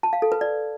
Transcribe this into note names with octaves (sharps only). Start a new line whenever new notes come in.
A5
F5
A4
B4
D5